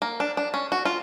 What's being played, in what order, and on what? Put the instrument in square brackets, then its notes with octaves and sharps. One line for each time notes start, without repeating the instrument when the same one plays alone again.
[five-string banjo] A#3
D4
D4
C#4
F#4
F4